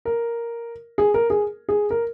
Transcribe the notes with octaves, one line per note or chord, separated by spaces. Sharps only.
A#4
G#4
A#4
G#4
G#4
A#4